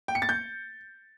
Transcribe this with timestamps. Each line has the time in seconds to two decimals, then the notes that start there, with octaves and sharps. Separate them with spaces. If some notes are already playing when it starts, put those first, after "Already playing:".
0.08 G5
0.15 C#7
0.22 A6
0.29 G6